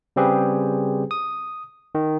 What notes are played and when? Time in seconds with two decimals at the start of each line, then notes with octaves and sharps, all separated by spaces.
0.16 C#3 G3 C4 G4 G#4 B4
1.11 D#6
1.95 D#3